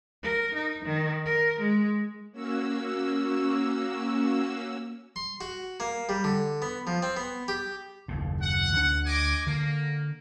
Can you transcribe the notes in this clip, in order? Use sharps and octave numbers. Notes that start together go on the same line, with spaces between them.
A#4
D#4
D#3
A#4
G#3
A#3 C#4 F#4 E6
C6
F#4
A#3
G3
D3
B3
F3
C4
B3
G4
F#1 D#2 A2
F#5
D2 D4
D#5 G#5 D6
D3 A#3